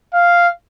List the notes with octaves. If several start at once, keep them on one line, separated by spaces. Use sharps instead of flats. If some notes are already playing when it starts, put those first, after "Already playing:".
F5